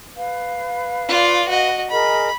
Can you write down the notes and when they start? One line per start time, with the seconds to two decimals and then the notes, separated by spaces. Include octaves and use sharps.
0.16 B4 F5
1.09 F4 D5
1.48 F#4 D#5
1.91 G#4 A#4 D#5 B5